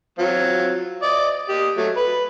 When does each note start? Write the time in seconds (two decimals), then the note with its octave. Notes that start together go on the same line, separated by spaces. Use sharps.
0.19 F#3 C4 F4
1.02 D5 D#5
1.49 G4 D#5
1.77 F#3 A3
1.97 B4